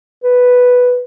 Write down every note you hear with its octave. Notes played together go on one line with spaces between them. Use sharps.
B4